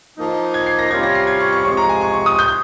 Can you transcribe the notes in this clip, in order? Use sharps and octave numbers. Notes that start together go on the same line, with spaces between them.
F3 A#3 D#4
G#6
C7
A#6
C3 G3 C#4 F4 G#6
A#6
C7
G#6
C#6
C#6
C3 F3 G#3 C#6
A#5
G#5
C#6
C#6
D#6
G6